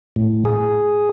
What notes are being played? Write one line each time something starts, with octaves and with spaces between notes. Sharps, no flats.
A2
G#4